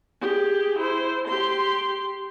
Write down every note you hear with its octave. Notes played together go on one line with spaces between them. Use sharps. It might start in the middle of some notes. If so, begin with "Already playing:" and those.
G4 G#4
E4 C5
G4 C6